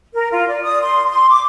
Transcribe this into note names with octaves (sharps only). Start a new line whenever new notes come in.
A#4
F4
D5
D#6
C6
C6
D6